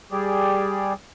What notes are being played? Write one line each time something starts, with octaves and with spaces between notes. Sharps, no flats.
G3 G4 G#4 D5